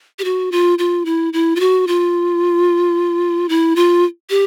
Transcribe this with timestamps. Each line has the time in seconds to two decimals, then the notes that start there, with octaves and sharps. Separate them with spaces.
0.19 G4
0.24 F#4
0.52 F4
0.79 F4
1.05 E4
1.33 E4
1.56 F4
1.60 F#4
1.87 F4
3.49 E4
3.76 F4
4.30 G4